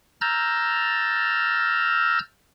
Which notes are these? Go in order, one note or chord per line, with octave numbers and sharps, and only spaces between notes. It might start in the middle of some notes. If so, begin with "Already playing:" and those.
A#5 E6 F6 G6 A6